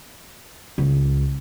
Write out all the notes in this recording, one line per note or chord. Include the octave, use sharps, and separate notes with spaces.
C#2